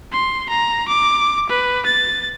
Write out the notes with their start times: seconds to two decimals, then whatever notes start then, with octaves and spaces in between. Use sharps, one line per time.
0.12 C6
0.49 A#5
0.88 D6
1.49 B4
1.85 A6